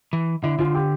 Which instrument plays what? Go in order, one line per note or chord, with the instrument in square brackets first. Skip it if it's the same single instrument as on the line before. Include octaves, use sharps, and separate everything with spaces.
[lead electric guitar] E3
[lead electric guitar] D3 [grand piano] E4
[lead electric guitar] D3 [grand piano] F4
[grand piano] G4